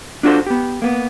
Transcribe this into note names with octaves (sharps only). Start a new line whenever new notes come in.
D4 F4 F#4 G#4 A4 C5
B3 G4
A#3 B3